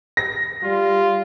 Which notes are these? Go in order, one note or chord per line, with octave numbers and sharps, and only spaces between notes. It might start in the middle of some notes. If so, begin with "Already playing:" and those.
A#6
G3 F4